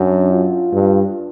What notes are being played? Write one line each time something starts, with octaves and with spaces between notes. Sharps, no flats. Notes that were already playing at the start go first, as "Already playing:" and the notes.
Already playing: F#2 D4
F4
G2